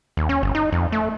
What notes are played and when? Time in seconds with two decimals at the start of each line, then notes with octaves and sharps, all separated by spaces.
0.17 D#2
0.29 C#4
0.43 G1
0.55 D#4
0.72 F2
0.92 A3